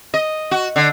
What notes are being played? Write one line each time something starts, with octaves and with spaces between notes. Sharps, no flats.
D#5
F#4
D3